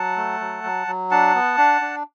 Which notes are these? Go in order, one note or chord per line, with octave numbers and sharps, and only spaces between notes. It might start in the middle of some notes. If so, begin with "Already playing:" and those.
Already playing: F#3 F#5 A5
A3
F#3
F#3
F#3
D4 F#5 A5
B3
D4
D4